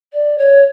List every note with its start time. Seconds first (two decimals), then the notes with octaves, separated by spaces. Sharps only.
0.13 D5
0.38 C#5